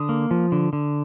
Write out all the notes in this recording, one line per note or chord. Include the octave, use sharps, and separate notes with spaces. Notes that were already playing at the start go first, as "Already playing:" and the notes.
Already playing: D3 D#6
A#3
F3
D3
D3